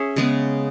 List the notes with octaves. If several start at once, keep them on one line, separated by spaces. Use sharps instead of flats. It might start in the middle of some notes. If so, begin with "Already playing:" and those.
Already playing: C#4 G#4 C#5 E5
C#3 G#3 B3